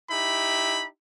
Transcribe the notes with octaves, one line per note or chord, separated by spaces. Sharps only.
D#4 E4 G4 B5